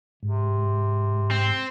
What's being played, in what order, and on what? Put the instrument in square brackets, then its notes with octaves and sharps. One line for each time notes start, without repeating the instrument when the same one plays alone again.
[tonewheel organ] G#2 [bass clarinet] C3
[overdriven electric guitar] C4